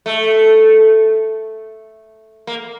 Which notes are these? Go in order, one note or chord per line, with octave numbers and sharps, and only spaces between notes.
A3
A#3